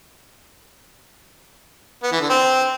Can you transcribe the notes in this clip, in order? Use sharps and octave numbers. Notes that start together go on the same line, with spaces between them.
B3
E3
D3
C4